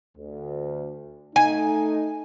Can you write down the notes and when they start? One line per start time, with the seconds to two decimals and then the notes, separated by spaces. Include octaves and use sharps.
0.18 D2
1.36 A3 D#4 G#5